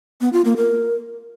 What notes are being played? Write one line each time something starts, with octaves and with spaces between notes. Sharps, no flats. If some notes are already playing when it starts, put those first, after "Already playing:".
B3
F4
A#3
A#4